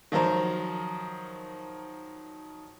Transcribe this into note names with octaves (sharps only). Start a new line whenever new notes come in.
D#3 F3 F#3 A#4 C5